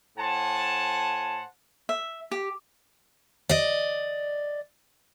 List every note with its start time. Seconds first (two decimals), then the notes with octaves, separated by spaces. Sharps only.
0.18 A2 C5 F#5 G#5 A5
1.89 E5
2.31 G4
3.49 D5 D#5